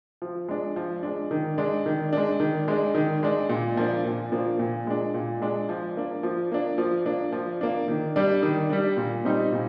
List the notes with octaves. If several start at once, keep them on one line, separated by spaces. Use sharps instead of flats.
F3
G#3 D4
F3
G#3 D4
D#3
G#3 D4
D#3
G#3 D4
D#3
G#3 D4
D#3
G#3 D4
A#2
F3 A#3 D4
A#2
F3 A#3 D4
A#2
G#3 D4
A#2
G#3 D4
F3
A#3 D4
F3
A#3 D4
F3
A#3 D4
F3
A#3 D4
D#3
G3 D4
D#3
G3 D4
A#2
G3 C4 D#4
A#2